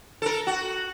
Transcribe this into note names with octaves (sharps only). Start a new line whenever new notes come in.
A4 A#4
F#4